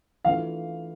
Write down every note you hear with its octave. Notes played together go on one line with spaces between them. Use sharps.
E3 A3 D4 F4 F5